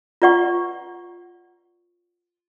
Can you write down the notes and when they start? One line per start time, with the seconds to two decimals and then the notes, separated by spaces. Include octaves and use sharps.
0.22 F4 B4 D5 F#5 C#6